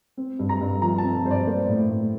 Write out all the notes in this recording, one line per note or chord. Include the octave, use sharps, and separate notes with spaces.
C4
G2
A#5
G2
F3 A#5
A5
C4
G2 C5
D5
A#3 C5
A2
A2